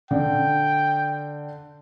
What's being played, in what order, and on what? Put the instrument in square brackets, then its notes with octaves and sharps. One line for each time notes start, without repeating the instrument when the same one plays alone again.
[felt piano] D3 [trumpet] G5